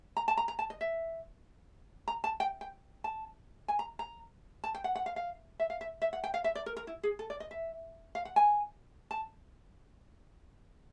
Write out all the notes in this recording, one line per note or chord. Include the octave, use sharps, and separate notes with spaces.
A#5
A5
A#5
A#5
A5
D#5
E5
A#5
A5
G5
G5
A5
G#5
A#5
A#5
A5
G5
F#5
F#5
F5
F5
E5
F5
E5
E5
F#5
G5
F5
E5
D5
A#4
A#4
E4
G#4
A4
D5
D#5
E5
F5
F#5
G#5
A5